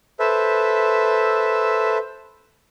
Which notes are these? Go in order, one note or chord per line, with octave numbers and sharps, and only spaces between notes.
A4 B4 C5 E5